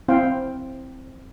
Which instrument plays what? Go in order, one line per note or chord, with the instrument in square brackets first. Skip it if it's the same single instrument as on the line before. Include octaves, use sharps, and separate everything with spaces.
[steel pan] C4 E4 C5 F5 G5